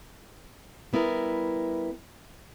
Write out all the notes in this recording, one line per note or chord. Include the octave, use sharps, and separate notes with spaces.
G3 B3 E4 A#4